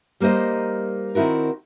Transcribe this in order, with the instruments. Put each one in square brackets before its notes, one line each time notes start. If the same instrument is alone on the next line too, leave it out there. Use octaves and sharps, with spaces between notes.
[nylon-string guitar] G3 A#3 D#4 C5 D#5
D#3 C4 E4 F#4 A#4